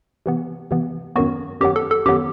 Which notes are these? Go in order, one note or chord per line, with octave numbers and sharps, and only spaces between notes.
C3 E3 B3
C3 E3 B3
F#2 D#3 F#3 B3 F#4
F#2 D#3 F#3 B3 G4
A4
A4
F#2 D#3 F#3 B3 G4